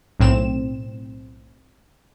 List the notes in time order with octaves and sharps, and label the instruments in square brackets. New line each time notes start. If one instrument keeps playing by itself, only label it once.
[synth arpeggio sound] B1 A2 C4 E7